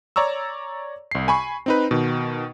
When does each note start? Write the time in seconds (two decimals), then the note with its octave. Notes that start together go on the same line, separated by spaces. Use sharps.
0.16 C#5 D5 A#5 C#6 E6
1.11 C2 C7
1.28 G#5 B5 C#6
1.66 C4 D#4 B4
1.91 B2 D#3